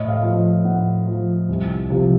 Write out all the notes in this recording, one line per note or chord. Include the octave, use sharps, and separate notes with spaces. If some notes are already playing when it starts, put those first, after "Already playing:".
Already playing: A2 D#5
F5
F3
A2 F#5
F3
C2
C3 F3